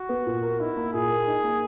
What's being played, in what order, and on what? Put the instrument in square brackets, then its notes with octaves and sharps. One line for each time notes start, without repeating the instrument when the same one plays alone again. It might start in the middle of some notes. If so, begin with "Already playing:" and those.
Already playing: [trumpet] F#4
[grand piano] B3
A#2
A#4
[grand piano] D#4 [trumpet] E4
[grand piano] A#3
[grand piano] A#2 [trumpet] G#4
[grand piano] A#4
D#4
A#3